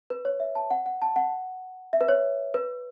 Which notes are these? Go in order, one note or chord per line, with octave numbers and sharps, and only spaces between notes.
B4
C#5
E5
A5
F#5
F#5
A5
F#5
E5
B4
C#5
B4